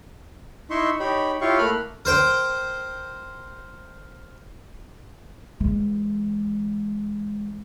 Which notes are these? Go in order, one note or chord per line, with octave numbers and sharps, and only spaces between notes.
D#4 E4 E5 C6 C#6
D#4 G4 C#5 B5
E4 F4 G4 C#5 F5 C#6
A3 A#3 B5 F6 F#6
A#4 C5 G5
E3 G#3